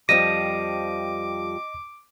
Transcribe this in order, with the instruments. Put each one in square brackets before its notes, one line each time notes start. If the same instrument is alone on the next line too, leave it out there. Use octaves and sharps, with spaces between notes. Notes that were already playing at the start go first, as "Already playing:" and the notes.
[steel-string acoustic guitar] F2 F3 G3 [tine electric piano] D#5 A#6 [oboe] D6 [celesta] D#7